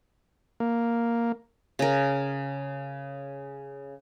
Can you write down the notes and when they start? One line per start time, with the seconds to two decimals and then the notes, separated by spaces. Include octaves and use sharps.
0.60 A#3
1.79 C#3 A#4